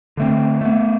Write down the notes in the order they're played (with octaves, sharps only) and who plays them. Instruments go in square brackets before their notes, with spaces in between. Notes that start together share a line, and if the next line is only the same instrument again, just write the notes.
[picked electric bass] D3 A3 C4
A3 B3